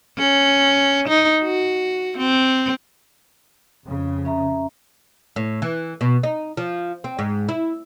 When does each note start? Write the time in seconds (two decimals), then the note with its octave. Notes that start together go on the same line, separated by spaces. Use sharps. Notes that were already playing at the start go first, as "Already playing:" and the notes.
0.18 C#4
1.08 D#4
1.43 F#4
2.18 C4
3.85 F2 C#3
4.25 C#4 E5 A#5
5.36 A2
5.62 E3
6.01 B2
6.23 D#4
6.57 F3
7.04 C4
7.19 G#2
7.49 E4